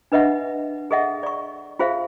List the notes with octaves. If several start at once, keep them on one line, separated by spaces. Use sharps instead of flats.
D4 B4 D#5 E5 F#5
G#4 A4 D#5 E5 F#5
D5 C#6
F4 G#4 C5 E5 F5